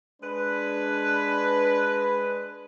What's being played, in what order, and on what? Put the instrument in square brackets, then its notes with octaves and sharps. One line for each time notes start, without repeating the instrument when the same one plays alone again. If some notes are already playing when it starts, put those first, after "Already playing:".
[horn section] G#3 D4 B4